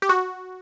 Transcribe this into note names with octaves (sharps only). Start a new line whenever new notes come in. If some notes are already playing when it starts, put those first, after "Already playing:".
G4
F#4